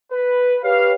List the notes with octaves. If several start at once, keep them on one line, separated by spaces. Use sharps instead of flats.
B4
G4 B4 C#5 F5